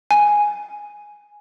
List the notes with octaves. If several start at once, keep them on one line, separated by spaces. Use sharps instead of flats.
G#5